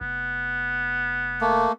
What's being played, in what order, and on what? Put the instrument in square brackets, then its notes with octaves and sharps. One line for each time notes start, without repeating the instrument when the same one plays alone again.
[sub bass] F1 [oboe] B3
[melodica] A3 A#3